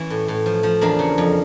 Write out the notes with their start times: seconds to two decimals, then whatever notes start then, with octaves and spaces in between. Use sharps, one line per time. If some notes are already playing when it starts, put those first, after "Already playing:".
Already playing: E3 C#4 E4
0.10 A2
0.28 A2
0.46 F3
0.63 F3
0.81 E2 A#3 D4
0.99 C#3
1.18 F2